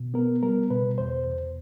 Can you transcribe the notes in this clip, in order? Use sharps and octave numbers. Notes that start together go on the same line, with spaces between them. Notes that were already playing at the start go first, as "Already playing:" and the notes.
Already playing: B2
B3 A#4
G3 A#4
B2 B4
E2 C5
E2